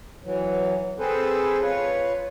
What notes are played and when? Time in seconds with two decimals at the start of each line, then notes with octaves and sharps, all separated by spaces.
0.25 E3 F#3
0.99 C4 G#4 A4 B4 C5
1.62 F4 B4 C#5